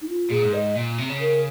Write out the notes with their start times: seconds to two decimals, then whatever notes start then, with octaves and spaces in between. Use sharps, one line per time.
0.02 D#4
0.09 F4
0.30 A#2 G#4
0.42 G#2
0.54 D#5
0.75 A#2
0.98 C3
1.09 C#3
1.20 A#4